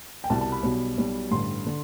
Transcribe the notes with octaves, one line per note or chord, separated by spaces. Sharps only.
G5
C2 B2 G3 A5
A5
B5
B1 B2 G3
B1 B2 G3
A1 G2 D3 C6
D3